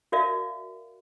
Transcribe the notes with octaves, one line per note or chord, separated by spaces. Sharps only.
F#4 A#4 D5 E5 F5